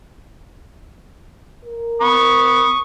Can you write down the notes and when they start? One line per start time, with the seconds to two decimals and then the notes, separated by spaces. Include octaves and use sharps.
1.65 A#4
2.01 B5 C#6 D#6